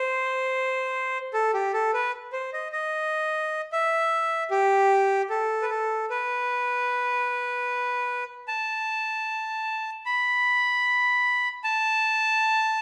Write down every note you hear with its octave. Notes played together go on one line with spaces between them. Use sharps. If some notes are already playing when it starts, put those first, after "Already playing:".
Already playing: C5
A4
G4
A4
B4
C5
D#5
D#5
E5
G4
A4
B4
A4
B4
A5
B5
A5